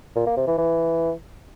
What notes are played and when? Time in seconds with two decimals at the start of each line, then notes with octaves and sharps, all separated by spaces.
0.16 A#2
0.26 A#3
0.37 C3
0.47 E3
0.58 E3